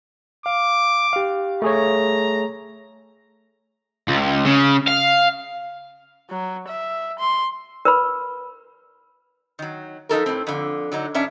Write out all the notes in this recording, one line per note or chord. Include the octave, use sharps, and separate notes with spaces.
F5 D6
G4 F5
A3 G#4 C#5 A#5
C#2
C#3
F5
F#3
E5
C6
A#4 B4 B5
D#3 F#3
F3 D#4 A4 A#4
A2 C4
F2 D3
D3 F#3 D#4
G#2 C#4 D4 E5